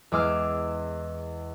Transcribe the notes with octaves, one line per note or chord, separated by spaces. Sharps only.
E2 G#3 D6 E6 F6